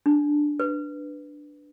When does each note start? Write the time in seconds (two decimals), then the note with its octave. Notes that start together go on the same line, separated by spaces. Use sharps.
0.06 D4
0.60 B4